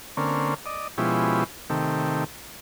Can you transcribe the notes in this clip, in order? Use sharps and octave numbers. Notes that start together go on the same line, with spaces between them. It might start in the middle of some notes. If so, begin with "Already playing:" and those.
D3 A#3 C4 C#4
D5 D#5
B2 F3 G#3 C#4 E4 G4
C3 D#3 A3 G4